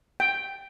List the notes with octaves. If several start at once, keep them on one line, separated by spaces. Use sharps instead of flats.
G5